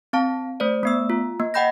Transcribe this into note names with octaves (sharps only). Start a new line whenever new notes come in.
C4 F5 A5
A3 C5 D5
A3 B3 E6
F4
A#3
D#5 F#5 G5 B5 G6 A#6